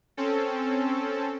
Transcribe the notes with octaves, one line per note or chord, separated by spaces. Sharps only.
C4 C#4 A4